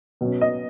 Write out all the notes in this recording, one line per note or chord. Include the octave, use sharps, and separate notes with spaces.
B2 F#3 C#4
D#5